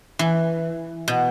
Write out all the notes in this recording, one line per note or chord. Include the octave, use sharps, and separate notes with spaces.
E3
B2